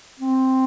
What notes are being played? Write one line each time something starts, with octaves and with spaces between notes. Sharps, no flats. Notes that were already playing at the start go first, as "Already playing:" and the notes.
C4